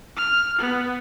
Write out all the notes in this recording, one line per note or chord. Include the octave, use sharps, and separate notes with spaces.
F6
B3